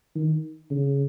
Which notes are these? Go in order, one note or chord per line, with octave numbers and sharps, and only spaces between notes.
D#3
C#3